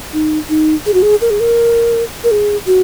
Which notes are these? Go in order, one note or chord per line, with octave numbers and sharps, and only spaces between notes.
D#4
D#4
G#4
F#4
G#4
A#4
G#4
A#4
A#4
G#4
F#4